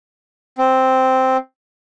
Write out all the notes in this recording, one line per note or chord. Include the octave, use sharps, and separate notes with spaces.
C4